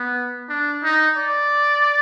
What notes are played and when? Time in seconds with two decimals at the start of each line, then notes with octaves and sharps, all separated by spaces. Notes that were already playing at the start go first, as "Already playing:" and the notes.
Already playing: B3
0.49 D4
0.83 D#4
1.17 D5